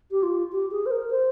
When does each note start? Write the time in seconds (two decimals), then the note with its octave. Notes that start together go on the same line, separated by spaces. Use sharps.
0.11 G4
0.23 F4
0.52 G4
0.71 G#4
0.86 C5
0.91 A#4
1.10 C5